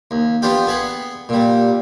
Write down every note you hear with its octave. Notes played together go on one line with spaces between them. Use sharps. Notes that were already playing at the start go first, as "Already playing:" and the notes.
D#2
B3 D4 F4 G4
B3 G#4 F#5
A#2 G3